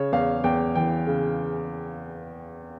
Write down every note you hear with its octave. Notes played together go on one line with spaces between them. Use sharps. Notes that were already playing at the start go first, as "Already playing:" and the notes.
Already playing: C#3 C#5
E2 F5
E2 G5
E3 G5
C#3